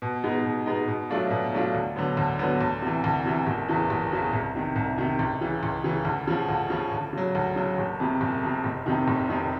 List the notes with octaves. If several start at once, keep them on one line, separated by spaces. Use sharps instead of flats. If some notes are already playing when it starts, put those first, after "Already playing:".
B2
G#3 B3 D#4
B2
G#3 B3 D#4
B2
F#3 A3 D4 F4
B2
F#3 A3 D4 F4
D2
D3 F#3 B3
D2
D3 F#3 B3
D2
C3 E3
D2
C3 E3
F#1
E2 C#3 E3
F#1
E2 C#3 E3
C2
C3 D#3
C2
C3 D#3
C#2
C#3 E3
C#2
C#3 E3
D2
C#3 F3
D2
C#3 F3
D2
C#3 F#3
D2
C#3 F#3
F#1
F2 C3
F#1
F2 C3
F1
F2 C3 D#3
F1
F2 C3 D#3